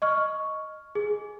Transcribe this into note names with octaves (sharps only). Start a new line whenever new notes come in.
D#5 C#6 F6
G#4